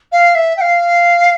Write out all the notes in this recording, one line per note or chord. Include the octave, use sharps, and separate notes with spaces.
F5
E5
G5
F5